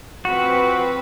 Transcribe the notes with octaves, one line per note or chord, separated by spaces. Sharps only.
F3 C4 F#4 B4